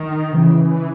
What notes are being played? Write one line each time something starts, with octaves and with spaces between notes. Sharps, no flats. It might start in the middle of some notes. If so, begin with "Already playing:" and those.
Already playing: D#3
C#3 E3